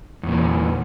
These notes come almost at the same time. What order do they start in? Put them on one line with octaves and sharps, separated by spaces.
E2 A#2 E3